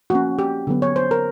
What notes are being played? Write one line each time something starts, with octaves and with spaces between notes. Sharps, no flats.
F3 A#3 C#4 F#4
G4
D3 F#3 B3
C#5
C5
A#4